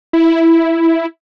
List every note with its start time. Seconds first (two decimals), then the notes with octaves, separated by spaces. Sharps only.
0.13 E4